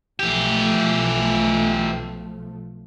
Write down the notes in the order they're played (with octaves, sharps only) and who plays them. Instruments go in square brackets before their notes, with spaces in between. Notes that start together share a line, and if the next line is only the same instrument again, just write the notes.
[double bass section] B1 F3 A3 [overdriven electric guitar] E3 G4